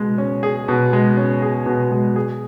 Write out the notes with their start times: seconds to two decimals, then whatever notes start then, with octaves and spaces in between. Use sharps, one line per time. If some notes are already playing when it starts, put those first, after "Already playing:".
Already playing: B2 G#3
0.18 C#4
0.43 G#4
0.68 B2
0.93 G#3
1.17 C#4
1.42 G#4
1.66 B2
1.92 G#3
2.16 G#4